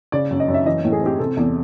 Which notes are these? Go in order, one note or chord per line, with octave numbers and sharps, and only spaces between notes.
C#3 D5
F#2
D#5
F#2
E5
E3 D#5
A2
G#4
C4 G4
C3 A4
E2